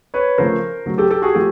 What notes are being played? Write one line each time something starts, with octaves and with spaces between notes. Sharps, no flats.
B4 C#5
C#3 F3 A3 A#4 C5
C#3 F#3 A3
G4 A4
G4 A4
F#4 G#4
F3 A3 G4 A4